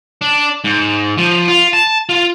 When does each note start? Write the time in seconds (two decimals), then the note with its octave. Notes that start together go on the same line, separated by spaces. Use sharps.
0.21 D4
0.64 G#2
1.18 F3
1.48 F4
1.73 A5
2.09 F4